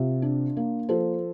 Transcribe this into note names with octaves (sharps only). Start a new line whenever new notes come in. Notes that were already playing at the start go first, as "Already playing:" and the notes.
Already playing: C3 F4
D4
A#3
F3 A4 C5